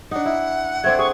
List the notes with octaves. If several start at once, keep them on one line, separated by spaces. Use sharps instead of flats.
D4 D#4 F#5
E4
A3 C4 D4 G#6
G#4 C#6